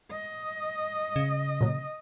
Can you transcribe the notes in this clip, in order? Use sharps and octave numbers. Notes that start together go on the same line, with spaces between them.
D#5
C#3
A#2 F#3